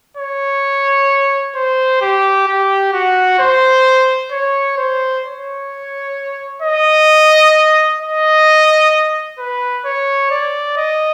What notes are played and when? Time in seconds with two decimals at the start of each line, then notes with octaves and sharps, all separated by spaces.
0.17 C#5
1.55 C5
2.01 G4
2.47 G4
2.93 F#4
3.39 C5
4.32 C#5
4.77 C5
5.24 C#5
6.62 D#5
8.00 D#5
9.39 B4
9.85 C#5
10.31 D5
10.77 D#5